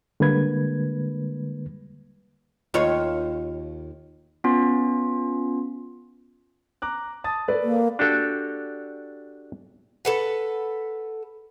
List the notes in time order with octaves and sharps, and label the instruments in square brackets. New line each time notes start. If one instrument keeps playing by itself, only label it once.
[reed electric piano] D3 G3 G#3 A#3 B4 G#6
[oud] D#2 F4 C#5
[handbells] B3 C#4 F4
[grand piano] A#5 D6 F#6
A5 D#6 A6
A4 B4 D5
[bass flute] A#3
[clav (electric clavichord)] D4 F#4 G4 A4
[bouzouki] A4 B4 F#5